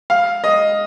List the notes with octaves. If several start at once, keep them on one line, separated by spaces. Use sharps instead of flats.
F5
D#5